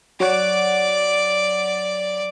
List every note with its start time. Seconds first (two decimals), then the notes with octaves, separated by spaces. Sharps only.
0.20 F#3 C#5 D5 F#5 D6